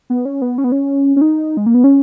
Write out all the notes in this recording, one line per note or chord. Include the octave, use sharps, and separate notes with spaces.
B3
C#4
B3
C#4
B3
C#4
C#4
D#4
G#3
A#3
B3
C#4